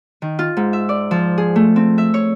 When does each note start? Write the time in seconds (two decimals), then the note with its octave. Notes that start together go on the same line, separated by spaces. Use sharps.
0.22 D#3
0.39 F4
0.57 G#2
0.73 E5
0.89 D5
1.11 F3
1.38 G#4
1.56 A3
1.76 C4
1.98 E5
2.14 C#5